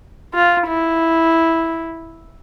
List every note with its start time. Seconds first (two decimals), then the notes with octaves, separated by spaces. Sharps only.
0.34 F4
0.67 E4